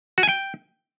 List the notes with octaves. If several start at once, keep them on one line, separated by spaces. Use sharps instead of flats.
F#4
G#5
G5